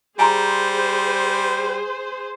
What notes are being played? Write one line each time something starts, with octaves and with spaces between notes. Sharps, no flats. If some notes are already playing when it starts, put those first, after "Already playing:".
G3 G#4 C5 G#5 A#5 C6